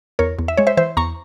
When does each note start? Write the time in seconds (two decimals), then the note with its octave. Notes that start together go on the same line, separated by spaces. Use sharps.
0.19 E2 A#4 C#5
0.39 E2
0.48 E5
0.57 G#3 C#5
0.67 C5 E5
0.77 E3 C5 E5
0.97 E2 A#5 C#6